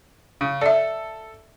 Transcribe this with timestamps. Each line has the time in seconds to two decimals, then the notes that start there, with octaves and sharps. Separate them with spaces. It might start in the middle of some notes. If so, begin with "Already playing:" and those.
0.41 C#3
0.61 A4 D5 E5